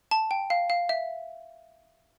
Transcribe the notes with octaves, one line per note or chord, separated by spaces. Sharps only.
A5
G5
F5
F5
E5